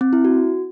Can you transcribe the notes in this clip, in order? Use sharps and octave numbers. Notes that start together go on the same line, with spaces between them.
C4
E4
F#4